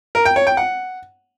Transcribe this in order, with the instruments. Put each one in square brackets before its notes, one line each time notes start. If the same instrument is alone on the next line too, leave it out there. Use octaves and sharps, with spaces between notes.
[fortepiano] A#4
G5
C#5
G5
F#5